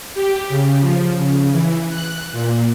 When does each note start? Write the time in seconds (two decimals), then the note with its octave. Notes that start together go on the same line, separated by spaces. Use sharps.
0.15 G4
0.49 C#3
0.80 F3
1.19 C#3
1.52 E3
1.89 F#6
2.32 A#2